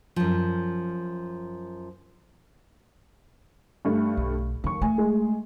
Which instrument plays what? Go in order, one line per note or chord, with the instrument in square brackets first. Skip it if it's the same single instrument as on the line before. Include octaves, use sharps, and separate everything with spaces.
[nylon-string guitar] F#2 F3
[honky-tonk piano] G2 A3
[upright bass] B1
[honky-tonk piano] D#2 C#6 [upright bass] F#3
[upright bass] A3 [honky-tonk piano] G#5
[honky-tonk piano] G#3